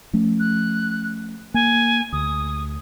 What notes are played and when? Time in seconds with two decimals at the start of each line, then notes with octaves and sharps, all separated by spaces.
0.13 F3 A3 C#4
0.40 F#6
1.54 A#3 G#5
2.13 D2 D#6